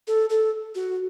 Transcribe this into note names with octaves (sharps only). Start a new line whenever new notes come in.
A4
A4
F#4